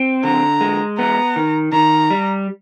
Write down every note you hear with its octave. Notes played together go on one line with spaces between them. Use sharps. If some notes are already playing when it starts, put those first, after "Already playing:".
Already playing: C4
D3 A#5
G#3
B3 A#5
D#3
D#3 A#5
G3